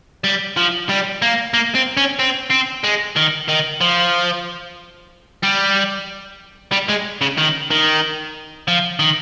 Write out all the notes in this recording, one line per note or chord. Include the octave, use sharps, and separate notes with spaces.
G3
F3
G3
A#3
A#3
C4
C#4
C4
C4
G#3
D#3
D#3
F3
G3
G3
G#3
C#3
D#3
D#3
F3
D#3